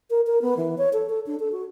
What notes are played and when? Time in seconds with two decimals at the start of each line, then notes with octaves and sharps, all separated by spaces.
0.10 A#4
0.27 A#4
0.42 B3
0.57 E3
0.78 C#5
0.93 A4
1.09 A4
1.27 D4
1.40 A4
1.52 F#4